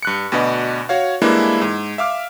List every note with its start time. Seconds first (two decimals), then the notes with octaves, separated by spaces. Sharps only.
0.03 G2 F#6 C#7
0.32 D2 B2 D4 B4 D#5
0.89 F#4 C#5 F5
1.22 E3 G3 G#3 A#3 D4 E4
1.61 G#2
1.98 E5 F5 D6 F6